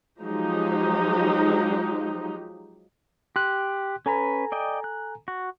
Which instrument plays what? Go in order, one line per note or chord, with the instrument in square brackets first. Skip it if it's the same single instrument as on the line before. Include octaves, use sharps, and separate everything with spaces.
[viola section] F3 F#3 G#3 D#4 G4
[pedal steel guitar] G4 [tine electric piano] C6 F#6
[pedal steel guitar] C#4 B4 [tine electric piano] A4 G#5 A#5
[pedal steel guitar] D5 D#5 G5
F#6
F#4